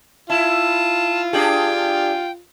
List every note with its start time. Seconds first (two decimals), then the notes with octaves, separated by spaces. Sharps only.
0.30 E4 F4 A5
1.33 D4 G4 G#4 G5